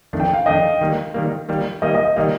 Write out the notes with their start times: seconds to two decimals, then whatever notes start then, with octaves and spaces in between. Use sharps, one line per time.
0.13 F2 D#3 A3 D4
0.20 G5
0.33 F5
0.46 F2 D#3 A3 D4 D#5
0.81 D#3 G3 A#3
1.14 D#3 G3 A#3
1.49 D#3 G3 A#3
1.82 D#3 G3 A#3 D#5
1.94 D#5
2.05 D#5
2.16 D#3 G3 A#3 D#5